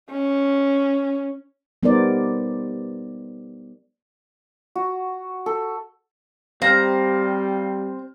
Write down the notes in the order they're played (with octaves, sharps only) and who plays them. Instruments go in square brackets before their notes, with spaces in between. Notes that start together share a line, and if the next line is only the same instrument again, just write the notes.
[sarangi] C#4
[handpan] G3 B3 D#4 A#4 C5 D5
[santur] F#4
A4
[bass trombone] G3 [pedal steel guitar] C4 C5 [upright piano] F5 F6 [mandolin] A#5